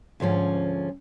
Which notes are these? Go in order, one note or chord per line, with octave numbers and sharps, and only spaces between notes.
D2 G#2 F3 C#4